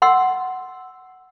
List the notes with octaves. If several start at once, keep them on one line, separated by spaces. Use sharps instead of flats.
F#5 C6 E6